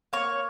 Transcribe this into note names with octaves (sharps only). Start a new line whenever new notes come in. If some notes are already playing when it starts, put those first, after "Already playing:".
A#3 C#5